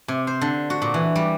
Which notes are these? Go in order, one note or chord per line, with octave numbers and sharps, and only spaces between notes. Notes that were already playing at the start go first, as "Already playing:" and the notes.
C3
C5
D3
F#4
A#2
E3
G3